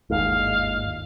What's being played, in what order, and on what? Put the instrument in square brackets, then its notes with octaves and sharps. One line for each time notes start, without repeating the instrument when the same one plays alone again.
[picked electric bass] G1 D#2 G#2 [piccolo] F5